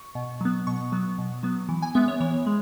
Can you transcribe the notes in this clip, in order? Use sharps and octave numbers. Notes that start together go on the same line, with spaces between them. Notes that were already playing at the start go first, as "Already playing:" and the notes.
Already playing: C#6
B2
F#3 B3
B2 C#6
F#3 B3
B2
F#3 B3
E3
G#5
G#3 B3 E5
C#5
E3 C#5
G#3